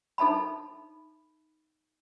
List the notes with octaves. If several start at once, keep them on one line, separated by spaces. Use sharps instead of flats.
D#4 A4 E5 A5 B5